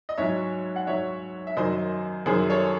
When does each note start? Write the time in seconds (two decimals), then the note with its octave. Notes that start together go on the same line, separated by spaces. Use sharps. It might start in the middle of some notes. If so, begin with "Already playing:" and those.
0.09 D#5
0.18 G#2 F#3 C#5 E5
0.76 F#5
0.87 G#2 F#3 C#5 E5
1.47 E5
1.57 F#2 D#3 F#3 C5 D#5
2.26 F#2 D#3 F#3 G#4 C5
2.50 A4 C#5